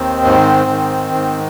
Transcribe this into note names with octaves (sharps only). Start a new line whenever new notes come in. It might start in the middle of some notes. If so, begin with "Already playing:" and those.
Already playing: D#2 D#3 C4
G#2
D#3
G#2